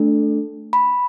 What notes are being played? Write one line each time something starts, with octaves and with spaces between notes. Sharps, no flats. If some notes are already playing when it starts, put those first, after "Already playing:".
Already playing: A3 D4 A4
B5